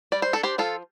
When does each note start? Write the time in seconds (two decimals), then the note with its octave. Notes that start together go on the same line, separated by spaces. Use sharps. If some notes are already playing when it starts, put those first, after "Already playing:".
0.12 G3 D5
0.22 C5
0.33 D4 A4
0.43 G4 C5
0.58 F3 F4 A4